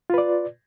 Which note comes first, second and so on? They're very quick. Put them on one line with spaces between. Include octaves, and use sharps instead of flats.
F4 B4 D5